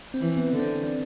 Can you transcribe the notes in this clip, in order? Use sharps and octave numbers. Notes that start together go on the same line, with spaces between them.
C4
E3
B3
D3
C4
D4